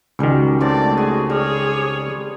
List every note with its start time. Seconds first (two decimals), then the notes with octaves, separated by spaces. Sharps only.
0.19 C#2 D#3 F#3 G3
0.61 A2 C3 D5 A5
0.97 F#4 G#4
1.30 G3 G#4 C#5